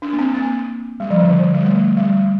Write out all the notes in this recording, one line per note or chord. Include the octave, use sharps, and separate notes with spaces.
D4
A#3
C4
A#3
G3
F3
D3
D3
G3
A3
G3